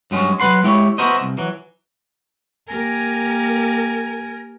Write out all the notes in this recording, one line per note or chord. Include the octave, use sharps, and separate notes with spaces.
G2 F#3 G#3 C#4
F#3 A3 B4 F#5 C6
G#3 E4 G4 C#5
B3 E4 F#4 A#4 C5 D#5
C2
E3 F#3
A#3 G4 A#4 G#5